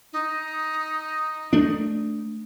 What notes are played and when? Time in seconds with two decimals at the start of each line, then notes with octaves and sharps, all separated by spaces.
0.13 D#4
1.53 A3 D4